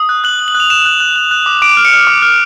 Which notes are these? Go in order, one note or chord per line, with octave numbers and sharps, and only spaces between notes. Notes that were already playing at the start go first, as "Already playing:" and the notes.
Already playing: D#6
F#6
F#6 F#7
F#6
F#7
F#6
F7
F#6 E7
F#6
F#6
F#6
F#6
D6
D6 D7
F6
C#7
F6
D6
F6